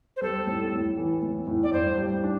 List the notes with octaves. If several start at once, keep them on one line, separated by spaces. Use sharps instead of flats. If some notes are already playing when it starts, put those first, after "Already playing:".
C5
G3 A4
A2
A2
E3
A2
A2
D5
G2 C5
G3
D4